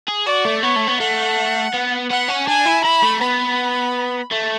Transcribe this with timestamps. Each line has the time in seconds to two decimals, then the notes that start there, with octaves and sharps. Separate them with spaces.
0.08 G#4
0.26 F#4 D5
0.45 A3
0.63 B3 C#5
0.76 A3
0.88 B3
1.00 A3 F#5
1.74 B3
2.10 B3 F#5
2.28 C#4
2.47 D4 G#5
2.65 E4
2.84 E4 B5
3.02 A3
3.20 B3 B5
4.31 A3